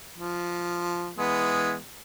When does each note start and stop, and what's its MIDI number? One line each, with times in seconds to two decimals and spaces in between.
0.17 1.12 53
1.18 1.75 52
1.18 1.75 56
1.18 1.75 59